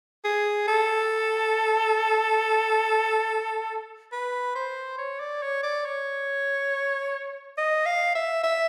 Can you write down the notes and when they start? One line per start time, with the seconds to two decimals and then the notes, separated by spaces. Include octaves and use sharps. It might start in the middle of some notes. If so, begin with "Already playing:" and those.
0.24 G#4
0.68 A4
4.12 B4
4.55 C5
4.98 C#5
5.20 D5
5.42 C#5
5.63 D5
5.85 C#5
7.58 D#5
7.86 F5
8.15 E5
8.43 E5